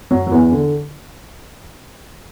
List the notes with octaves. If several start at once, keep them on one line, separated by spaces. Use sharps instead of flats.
F#2 F#3
F#3
E2 E3
D3